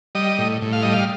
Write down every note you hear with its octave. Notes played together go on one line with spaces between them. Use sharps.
G3 D#5
A2
A2
F5
G3 D#5
F5